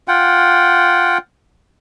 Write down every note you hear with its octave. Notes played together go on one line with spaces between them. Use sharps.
F4 F#5 G5